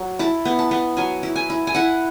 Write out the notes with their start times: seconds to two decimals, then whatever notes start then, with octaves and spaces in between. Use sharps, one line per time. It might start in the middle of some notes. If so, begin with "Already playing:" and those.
Already playing: F#3
0.19 E4 A5
0.45 B3
0.59 A5
0.71 B3
0.97 F#3 G#5
1.23 E4
1.36 G#5
1.50 E4
1.67 G#5
1.75 E4 F#5